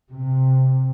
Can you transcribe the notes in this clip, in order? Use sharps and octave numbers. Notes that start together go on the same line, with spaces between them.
C3